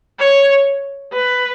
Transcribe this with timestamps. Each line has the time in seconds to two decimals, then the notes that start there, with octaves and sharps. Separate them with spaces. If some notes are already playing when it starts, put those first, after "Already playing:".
0.20 C#5
1.13 B4